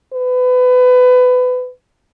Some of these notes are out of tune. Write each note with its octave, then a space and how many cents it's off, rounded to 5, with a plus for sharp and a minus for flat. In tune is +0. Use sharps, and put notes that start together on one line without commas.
B4 +25